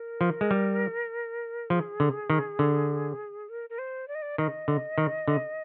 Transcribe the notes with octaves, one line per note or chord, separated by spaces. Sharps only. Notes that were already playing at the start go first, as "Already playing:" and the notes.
Already playing: A#4
F3
G#3
G3
F3 G#4
D3
D#3
D3
A#4
A#4
C5
D5
D#5
D5
D#3 D#5
D3
D#3
D3